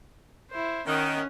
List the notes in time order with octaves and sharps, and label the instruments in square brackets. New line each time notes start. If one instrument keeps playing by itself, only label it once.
[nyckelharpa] E4 C5
[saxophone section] D#3 [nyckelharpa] C#4 F#5